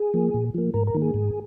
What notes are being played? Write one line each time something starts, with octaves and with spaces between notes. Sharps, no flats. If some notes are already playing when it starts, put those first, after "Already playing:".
Already playing: G#4
F3 A#3
A#2
F3 A#3
G#2 A#4
A#4
D#3 A#3
G#4
G#2